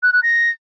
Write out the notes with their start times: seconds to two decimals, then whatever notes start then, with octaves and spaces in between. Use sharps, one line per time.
0.03 F#6
0.13 F#6
0.23 A#6